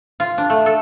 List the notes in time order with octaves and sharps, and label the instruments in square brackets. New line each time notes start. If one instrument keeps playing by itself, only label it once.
[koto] F4
D4
A3
A4